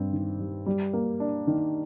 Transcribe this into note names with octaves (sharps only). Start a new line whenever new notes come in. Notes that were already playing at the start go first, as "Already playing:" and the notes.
Already playing: G2 C4
D#3
G3
G3
A#3
D4
D#3